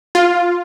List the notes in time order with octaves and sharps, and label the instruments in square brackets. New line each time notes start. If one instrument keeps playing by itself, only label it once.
[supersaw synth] F4